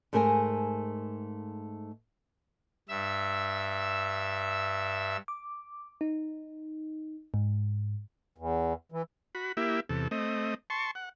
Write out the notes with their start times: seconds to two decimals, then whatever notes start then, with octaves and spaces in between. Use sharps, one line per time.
0.13 G#2 A3 G#4 A#4 G5 G#5
2.89 G2 E5 E6
5.28 D6
6.01 D#4
7.34 G#2
8.38 E2
8.92 E3
9.35 F#4 B5
9.57 A#3 E4 G4 E5
9.89 E2 C3 A4
10.11 A3 C4 D#5
10.70 A5 C6 C#6
10.95 F#5